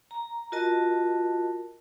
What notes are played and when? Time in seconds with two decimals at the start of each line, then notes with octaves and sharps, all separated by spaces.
0.11 A#5
0.52 F4 F#4 A#4 D#5 A5